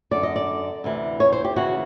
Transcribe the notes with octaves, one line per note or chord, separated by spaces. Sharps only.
F#2 D3 D5
D#5
D5
D2 C3 E3
C#5
C5
G4
D#2 C#3 E3 F#4